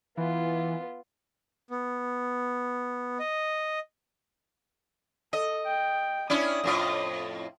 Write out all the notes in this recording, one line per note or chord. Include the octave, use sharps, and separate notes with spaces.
E3 B3 F4
B3
D#5
A4 D#5
G5
C#4 D4 E4 D#6
F2 A2 F4